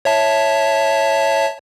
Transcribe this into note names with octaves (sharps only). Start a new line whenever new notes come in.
C#5 E5 A5